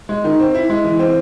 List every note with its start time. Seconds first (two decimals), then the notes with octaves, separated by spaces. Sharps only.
0.09 G#3
0.24 D#3
0.39 C4
0.54 E4
0.70 G#3
0.84 E3
0.99 C4